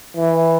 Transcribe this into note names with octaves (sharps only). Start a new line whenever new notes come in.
E3